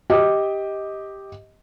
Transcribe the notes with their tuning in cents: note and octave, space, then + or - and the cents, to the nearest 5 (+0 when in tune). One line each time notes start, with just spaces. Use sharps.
G4 +0 D#5 +15